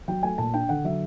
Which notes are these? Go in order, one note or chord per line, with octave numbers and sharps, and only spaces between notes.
F#3 G5
A3 G#5
A#2 A5
D4 G5
D3 F#5
F#3 E5